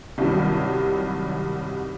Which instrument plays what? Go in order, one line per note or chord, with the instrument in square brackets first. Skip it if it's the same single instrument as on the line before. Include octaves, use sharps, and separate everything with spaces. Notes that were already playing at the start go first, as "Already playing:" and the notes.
[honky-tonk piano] C2 G2 C3 D#3 F#3 G3